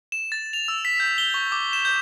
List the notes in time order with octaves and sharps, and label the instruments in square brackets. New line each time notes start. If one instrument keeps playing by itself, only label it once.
[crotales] E7
A6
F7
E6
B6
G6
G7
C#6
D6
E7
G6